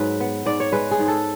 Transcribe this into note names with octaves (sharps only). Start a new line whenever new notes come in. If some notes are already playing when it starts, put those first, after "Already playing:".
Already playing: G#2 F#3 B4
B3
G#2 D5
C#5
G#3 B4
G#4
G#2
A4